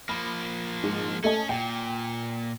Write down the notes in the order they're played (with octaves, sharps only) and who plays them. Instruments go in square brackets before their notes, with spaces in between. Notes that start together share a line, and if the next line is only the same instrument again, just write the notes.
[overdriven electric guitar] F3 A#3 [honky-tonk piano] B5
[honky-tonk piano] G#2
[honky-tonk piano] A3 D#5 A5 [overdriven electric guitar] C#4
[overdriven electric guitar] A#2 [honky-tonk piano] G5